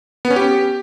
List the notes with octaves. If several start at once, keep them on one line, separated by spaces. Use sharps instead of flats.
B3
C#4
G4